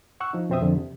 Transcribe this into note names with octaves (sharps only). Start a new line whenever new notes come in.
F#5 C#6 E6 F#6
F3 D#4
F2 B2 C4 C5 E5 D#6
F2 D3
C3